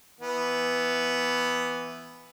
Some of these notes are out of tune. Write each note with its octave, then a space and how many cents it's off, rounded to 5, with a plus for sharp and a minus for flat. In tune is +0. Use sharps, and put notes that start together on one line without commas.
E3 +0 B3 +0